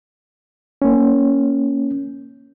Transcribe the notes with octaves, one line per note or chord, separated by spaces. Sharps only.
A#3 C#4